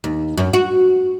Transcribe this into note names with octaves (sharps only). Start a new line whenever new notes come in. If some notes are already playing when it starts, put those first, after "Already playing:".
D#2
F#2
F#4